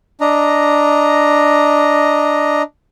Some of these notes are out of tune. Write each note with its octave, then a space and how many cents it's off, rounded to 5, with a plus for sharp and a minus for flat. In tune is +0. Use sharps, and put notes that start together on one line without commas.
D4 +0 D#5 +0 A#5 +0